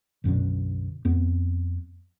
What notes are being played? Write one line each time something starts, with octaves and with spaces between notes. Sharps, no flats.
B1 F#2 B2 D3
F2 B3